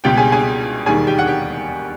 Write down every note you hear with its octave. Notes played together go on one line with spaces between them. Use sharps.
C#2 B2 G3 G4 G5
G#4 G#5
G#4 G#5
E1 D#2 D#3 G3 G#4 G#5
G4 G5
F#5
G4 G5